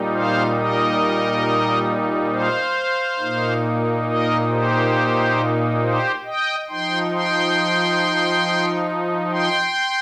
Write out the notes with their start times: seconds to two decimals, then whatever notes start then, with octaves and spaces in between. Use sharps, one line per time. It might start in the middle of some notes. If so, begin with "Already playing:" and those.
Already playing: A#2 G3 D#4
0.12 C5 F5
0.56 A#4 D#5
2.31 C5 F5
3.19 A#2 A#3 D#4
4.06 A#4 D#5
4.50 G4 C5
5.81 G4 C5
6.25 D#5 G5
6.68 F3 D#4 G5 C6
7.12 G5 C6
9.31 G5 C6